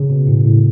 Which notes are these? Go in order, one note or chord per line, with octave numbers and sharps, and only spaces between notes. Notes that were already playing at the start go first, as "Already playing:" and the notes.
Already playing: C#3
B2
A2
A2